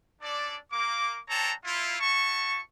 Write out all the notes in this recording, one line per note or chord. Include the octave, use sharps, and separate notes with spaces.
C#4 D4 A4 D5
A#3 D6
D4 A4 C#5 G5 A5 A#5
E4 F4
E4 F#4 A5 C#6